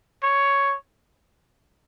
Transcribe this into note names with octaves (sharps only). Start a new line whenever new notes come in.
C#5